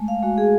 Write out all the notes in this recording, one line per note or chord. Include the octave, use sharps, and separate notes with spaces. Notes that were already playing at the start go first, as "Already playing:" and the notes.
Already playing: G#3 A3
F5
G#3 F#4
G#4